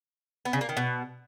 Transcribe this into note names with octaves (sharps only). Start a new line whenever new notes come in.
B3
C#3
A#3
D#3
B2